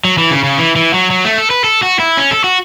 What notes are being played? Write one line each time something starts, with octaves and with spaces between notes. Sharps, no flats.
F#3
E3
C#3
C#3
E3
E3
F#3
F#3
A3
A4
B4
A4
F#4
E4
C#4
A4
F#4